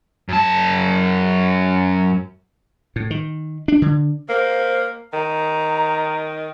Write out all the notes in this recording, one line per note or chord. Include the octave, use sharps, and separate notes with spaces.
F#2 A5
A2
D#3
D4
D3
A#3 C5
D#3 A#5